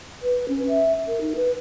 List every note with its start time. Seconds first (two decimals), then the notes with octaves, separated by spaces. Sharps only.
0.22 B4
0.49 C#4
0.68 E5
1.08 A#4
1.21 D#4
1.35 B4